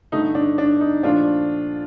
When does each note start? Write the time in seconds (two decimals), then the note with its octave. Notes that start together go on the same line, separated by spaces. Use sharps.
0.12 G2 D3 A3 D#4
0.35 D4
0.58 D4
0.81 D#4
1.03 A#2 F3 A3 D4 F4